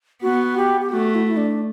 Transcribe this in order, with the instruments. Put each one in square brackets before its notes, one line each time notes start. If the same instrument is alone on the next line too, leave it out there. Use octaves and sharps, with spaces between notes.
[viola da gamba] B3 [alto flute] F#4
[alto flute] G4
G4
[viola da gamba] A3 [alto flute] F#4
[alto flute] E4
E4
D4